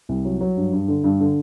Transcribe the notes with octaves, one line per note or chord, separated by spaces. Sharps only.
C2
F#3
F#3
G2
G2
D3
G2
D3